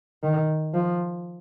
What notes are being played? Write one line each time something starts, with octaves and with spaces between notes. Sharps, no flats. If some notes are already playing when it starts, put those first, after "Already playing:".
D#3
F3